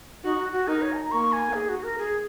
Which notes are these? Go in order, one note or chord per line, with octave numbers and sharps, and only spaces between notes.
D#4 F#4
F#4
F#4
D#4 A#4
C#5
G#5
A#5
A#3 C#6
G#5
G#4
F#4
A#4
G#4